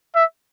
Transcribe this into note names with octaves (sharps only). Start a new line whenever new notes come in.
E5